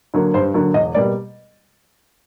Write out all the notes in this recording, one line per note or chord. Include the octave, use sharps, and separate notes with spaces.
D3 F#3 A#3
G2 C5
D3 F#3 A#3
E1 D#5
B2 G3 A#3 D5